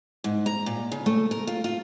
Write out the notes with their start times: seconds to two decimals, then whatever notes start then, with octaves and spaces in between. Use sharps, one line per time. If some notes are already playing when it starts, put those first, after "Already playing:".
0.24 G#2
0.46 A#5
0.66 A#2
0.92 C#3
1.06 A3
1.31 A#4
1.47 F4
1.64 F4